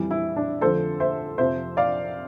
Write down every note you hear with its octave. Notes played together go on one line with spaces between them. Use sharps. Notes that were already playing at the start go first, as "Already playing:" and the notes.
Already playing: F2 E3 G3
E4
D4
F2 D3 F3 A3 A4 C5
C5 E5
F2 C3 F3 C5 E5
D5 F5